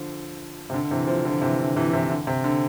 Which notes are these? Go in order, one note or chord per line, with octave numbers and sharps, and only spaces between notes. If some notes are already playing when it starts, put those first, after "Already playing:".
Already playing: D3 F3
C3
D3
D3
C3 E3
D3 F3
D3 F3
C3 E3
D3
C3 E3
C3 E3
D3
C3
D3